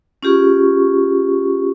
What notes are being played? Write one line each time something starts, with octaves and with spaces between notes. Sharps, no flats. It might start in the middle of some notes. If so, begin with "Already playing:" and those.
C#4 F4 G4 G#4 C#6